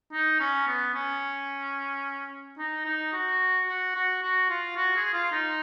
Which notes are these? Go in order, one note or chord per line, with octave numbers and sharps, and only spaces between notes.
D#4
C#4
B3
C#4
D#4
D#4
F#4
F#4
F#4
F#4
F4
F#4
G#4
F4
D#4